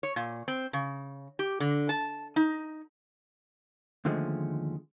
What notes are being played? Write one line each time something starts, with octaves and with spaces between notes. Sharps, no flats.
C#5
A#2
C4
C#3
G4
D3
A5
D#4
D#2 D3 F3 G#3 A3 C#4